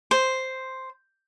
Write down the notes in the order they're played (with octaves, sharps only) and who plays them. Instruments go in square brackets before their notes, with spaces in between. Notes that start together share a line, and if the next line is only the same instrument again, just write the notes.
[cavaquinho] C5